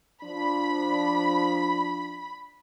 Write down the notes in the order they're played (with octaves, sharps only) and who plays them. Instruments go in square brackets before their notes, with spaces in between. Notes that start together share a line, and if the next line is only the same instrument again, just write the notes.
[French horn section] F3 D4 [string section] B5